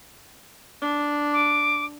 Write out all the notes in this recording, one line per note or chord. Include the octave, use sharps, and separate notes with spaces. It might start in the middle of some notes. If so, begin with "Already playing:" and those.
D4
D6